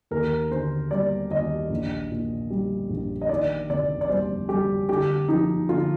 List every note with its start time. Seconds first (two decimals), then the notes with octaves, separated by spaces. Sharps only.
0.11 D#2 A#4
0.51 D3 C5
0.91 G3 D5
1.31 D#2 D#5
1.70 A#1
2.11 A#2
2.50 G3
2.89 A#1
3.21 D#5
3.29 D#3 D5
3.70 F1 D5
4.01 D5
4.09 G3 C5
4.49 G3 G4
4.89 D3 G4
5.28 F3 D#4
5.69 D3 F4